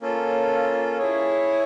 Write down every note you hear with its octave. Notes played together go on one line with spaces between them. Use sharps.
A#3 C#4 F4 A4
E4 G#4 C#5